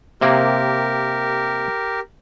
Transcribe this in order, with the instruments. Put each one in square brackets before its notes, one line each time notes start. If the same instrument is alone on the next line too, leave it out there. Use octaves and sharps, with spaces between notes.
[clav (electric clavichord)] C3 A#3 [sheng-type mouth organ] G4 A#4